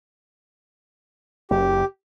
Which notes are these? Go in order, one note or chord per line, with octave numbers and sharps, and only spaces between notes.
F#1 G4